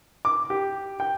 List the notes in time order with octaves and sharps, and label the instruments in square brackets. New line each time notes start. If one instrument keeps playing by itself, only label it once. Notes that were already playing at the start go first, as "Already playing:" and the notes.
[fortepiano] D6
G4
G5